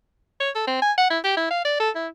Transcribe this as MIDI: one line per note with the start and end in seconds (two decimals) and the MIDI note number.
0.40 0.50 73
0.55 0.64 69
0.67 0.80 60
0.82 0.93 80
0.98 1.06 78
1.10 1.19 64
1.24 1.36 67
1.37 1.47 64
1.51 1.61 77
1.65 1.76 74
1.80 1.90 69
1.95 2.08 64